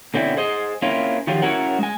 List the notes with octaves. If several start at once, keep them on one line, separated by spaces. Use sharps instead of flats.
B2 D3 C4 C#4 E4
G#4 C5 D#5
A#3 C4 C#4 E4 F4
D#3 F3 F#3 F4 G4
C#4 E4 F#4 A#4 C#5 F#5
G#3 G#5